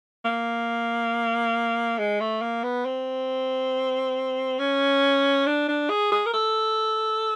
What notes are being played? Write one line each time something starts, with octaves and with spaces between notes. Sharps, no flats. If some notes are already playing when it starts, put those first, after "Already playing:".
A#3
G#3
A3
A#3
B3
C4
C#4
D4
D4
G#4
G#4
A#4
A4